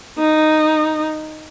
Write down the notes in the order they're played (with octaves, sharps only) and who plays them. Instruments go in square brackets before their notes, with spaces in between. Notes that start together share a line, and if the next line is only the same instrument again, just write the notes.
[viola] D#4